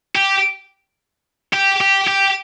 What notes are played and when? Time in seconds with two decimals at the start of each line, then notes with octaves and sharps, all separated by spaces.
0.16 G4
1.53 G4
1.81 G4
2.07 G4